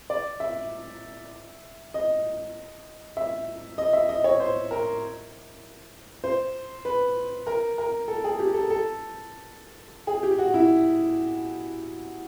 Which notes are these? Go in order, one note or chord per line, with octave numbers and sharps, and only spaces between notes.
D5
E5
D#5
E5
D#5
E5
D#5
C#5
C5
A#4
C5
B4
A#4
A#4
A4
G#4
G4
A4
A4
G#4
G4
F#4
E4